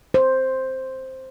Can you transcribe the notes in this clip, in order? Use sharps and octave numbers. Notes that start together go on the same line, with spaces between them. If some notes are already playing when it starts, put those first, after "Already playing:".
C5